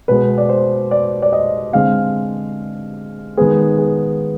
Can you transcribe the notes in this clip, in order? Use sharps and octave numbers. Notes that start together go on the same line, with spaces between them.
B2 G#3 B3 B4
D5
C5
D5
D5
D#5
D3 G#3 C4 F5
D#3 G#3 B3 G#4
G#4